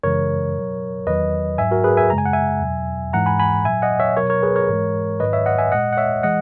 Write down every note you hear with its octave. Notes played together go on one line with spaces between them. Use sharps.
F#2 C#3 E3 G#3 A#4 C#5
B2 F#3
E2 D#3 F#3 B4 D#5
G#2 F#3 E5 G#5
F#4 A#4
G#4 B4
E5 G#5
F#2 C#3 G#3 A#5
G#5
F#5
E5 G#5
E2 B2 F#3
G#2 E3 G#3 F#5 A#5
G#5 B5
G#5 B5
A#2 F#3 E5 G#5
D#5 F#5
C#5 E5
B2 F#3 A#4 C#5
A#4 C#5
G#4 B4
A#4 C#5
G#2 E3 G#3
G#2 D#3 F#3 B4 D#5
C#5 E5
D#5 F#5
E5 G#5
A#2 G#3 D#5 F#5
F#5
C#5 E5
E3 G#3 D#5 F#5